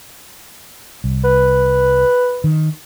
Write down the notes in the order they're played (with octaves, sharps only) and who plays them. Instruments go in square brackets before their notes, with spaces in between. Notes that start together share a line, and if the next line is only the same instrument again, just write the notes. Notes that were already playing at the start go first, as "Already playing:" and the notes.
[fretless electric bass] C2
[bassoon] B4
[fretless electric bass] D#3